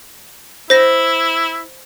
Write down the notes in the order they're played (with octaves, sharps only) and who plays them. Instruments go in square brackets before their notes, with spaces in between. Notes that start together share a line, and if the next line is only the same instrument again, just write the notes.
[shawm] E4 [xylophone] C5 A#6